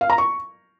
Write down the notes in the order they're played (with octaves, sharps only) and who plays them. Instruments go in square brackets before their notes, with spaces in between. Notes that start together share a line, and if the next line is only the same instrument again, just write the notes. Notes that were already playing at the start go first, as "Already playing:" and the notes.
[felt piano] F5
A#5
C#6